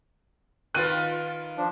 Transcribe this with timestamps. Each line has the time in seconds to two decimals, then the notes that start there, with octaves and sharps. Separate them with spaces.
0.74 D#3 F4 B4 F#6 D#7
1.58 F3 D4